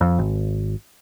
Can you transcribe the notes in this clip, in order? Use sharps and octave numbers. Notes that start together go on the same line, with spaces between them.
F2
G#1